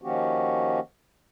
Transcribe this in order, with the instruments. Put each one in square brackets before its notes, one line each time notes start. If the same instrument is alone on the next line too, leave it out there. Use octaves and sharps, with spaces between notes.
[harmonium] D#3 F3 A#3 C#4 F#4 G4